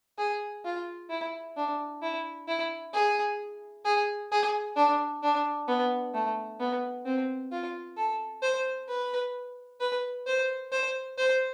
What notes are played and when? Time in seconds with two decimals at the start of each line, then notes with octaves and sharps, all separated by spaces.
0.19 G#4
0.65 F4
1.10 E4
1.57 D4
2.02 E4
2.48 E4
2.94 G#4
3.85 G#4
4.32 G#4
4.76 D4
5.23 D4
5.68 B3
6.14 A3
6.60 B3
7.06 C4
7.52 F4
7.97 A4
8.43 C5
8.89 B4
9.80 B4
10.27 C5
10.72 C5
11.18 C5